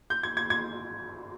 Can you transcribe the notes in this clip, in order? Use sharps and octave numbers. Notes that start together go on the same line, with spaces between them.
G6
G#6
G#6
G#6